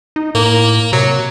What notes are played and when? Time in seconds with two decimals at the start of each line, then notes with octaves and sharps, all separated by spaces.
0.16 D#4
0.35 A2 A#3
0.93 C3 F#3